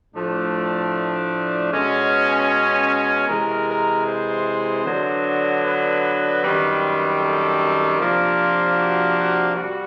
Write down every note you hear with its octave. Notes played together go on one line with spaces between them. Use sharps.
A2 F3 A3 D4
B2 G#3 C#4
C3 E3 G#3 A#4
A#4
C5
D3 F#3 B3 D4
B4
F#2 D#3 G3 C4
A4
C3 F3 A#3 D4 F4
F4
F#4
F#4
G3 F#4